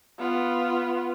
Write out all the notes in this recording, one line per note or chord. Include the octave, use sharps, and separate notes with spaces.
B3 F4